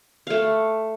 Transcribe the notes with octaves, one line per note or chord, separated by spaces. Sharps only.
A3 F5